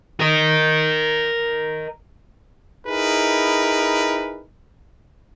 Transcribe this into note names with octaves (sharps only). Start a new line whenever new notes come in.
A#4 D#5
D#4 E4 G#4 A#4 B4